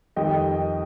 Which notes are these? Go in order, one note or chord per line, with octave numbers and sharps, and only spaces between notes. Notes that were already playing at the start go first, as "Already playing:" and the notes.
F2 D#3 G3 D#5 G5